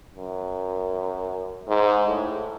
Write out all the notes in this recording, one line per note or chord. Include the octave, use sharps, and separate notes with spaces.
F#2
G#2
A2